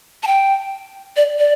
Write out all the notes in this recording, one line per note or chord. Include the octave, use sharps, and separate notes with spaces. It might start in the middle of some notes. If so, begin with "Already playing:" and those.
A5
G5
D5
D5